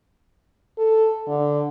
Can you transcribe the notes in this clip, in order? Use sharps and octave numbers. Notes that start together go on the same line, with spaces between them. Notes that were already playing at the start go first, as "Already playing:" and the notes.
A4
D3